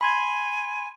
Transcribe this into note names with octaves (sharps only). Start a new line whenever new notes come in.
G#5 B5 C6 G#6